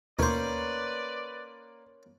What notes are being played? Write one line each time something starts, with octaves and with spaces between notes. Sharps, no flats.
D#2 B2 A3 A#3 C#4 B4 C5 D5